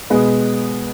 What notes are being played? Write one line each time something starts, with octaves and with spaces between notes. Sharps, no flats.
B2 G#3 B3